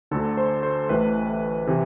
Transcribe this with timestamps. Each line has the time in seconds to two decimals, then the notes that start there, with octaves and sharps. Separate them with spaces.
0.11 D2 D3 A4
0.37 C5
0.63 C5
0.89 A1 A2 E3 B4
1.67 C3 E3